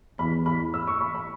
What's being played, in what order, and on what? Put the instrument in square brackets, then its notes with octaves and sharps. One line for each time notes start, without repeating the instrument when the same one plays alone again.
[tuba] E2 [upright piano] B5
[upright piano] B5
E6
C#6
B5
B5